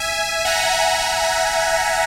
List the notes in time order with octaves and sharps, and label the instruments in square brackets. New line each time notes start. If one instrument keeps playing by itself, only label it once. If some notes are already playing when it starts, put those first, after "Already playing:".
Already playing: [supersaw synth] E5 G#5
F#5 A#5